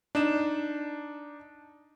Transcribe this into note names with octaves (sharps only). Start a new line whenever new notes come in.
D4 D#4 E7